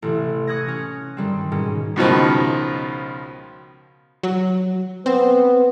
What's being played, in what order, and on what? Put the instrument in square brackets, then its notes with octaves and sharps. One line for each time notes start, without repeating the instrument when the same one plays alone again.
[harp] A1 C3 E3
C#6 D#6 F#6 G#6 A#6
C#4
G2 D#3 G3 C4
G#2 B2 D#3 C#4
[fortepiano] C#2 B2 D#3 F3
[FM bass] F#3
[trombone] B3 [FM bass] C4